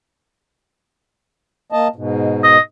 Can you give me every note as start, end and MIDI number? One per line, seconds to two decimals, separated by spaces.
1.72 1.88 58
1.72 1.88 75
1.72 1.88 81
1.96 2.57 44
1.96 2.57 47
2.44 2.59 75